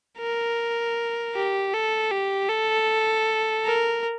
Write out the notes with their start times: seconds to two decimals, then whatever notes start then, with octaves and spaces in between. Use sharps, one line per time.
0.20 A#4
1.35 G4
1.73 A4
2.11 G4
2.49 A4
3.65 A#4